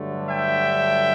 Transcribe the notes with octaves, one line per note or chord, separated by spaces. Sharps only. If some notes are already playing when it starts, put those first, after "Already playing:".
Already playing: G2 D3 F#3 A3
E5 G5